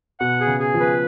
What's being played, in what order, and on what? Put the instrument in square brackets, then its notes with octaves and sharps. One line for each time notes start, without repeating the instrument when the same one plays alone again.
[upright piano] B2 [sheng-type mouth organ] F#5
[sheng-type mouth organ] G#4
[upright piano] C#3
[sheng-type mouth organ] G#4
[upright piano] F3
[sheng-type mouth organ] B4